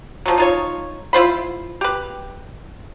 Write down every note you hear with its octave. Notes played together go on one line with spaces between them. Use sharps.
F3 F#3
D#4 F4 C#5
E4 F4 C5 B5
G4 B4